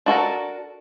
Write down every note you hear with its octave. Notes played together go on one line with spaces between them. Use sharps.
D4 F#4 A4 A#4